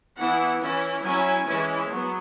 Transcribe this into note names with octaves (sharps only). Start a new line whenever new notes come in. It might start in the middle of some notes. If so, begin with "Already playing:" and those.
E3 B3 E4 F#5
E3 C#4 E4
F#3 C#4 E4 G#5
E3 G#3 C#4 E4
F#3 B3